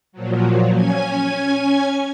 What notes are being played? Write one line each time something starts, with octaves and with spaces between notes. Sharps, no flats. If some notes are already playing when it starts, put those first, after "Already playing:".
A#2 F3 F#3
C#4 G#5 G#6